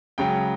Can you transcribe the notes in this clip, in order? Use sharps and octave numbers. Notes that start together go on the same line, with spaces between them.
C#2 C#3 F#3 G5